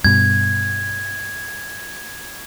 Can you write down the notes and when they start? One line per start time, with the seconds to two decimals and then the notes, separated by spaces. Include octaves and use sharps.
0.04 G2 B2 G#6